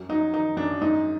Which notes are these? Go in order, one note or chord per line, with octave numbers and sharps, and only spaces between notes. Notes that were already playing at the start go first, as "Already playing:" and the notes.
Already playing: F#2
F#3 D#4
D#3 D#4
F#2 D4
G#2 D#4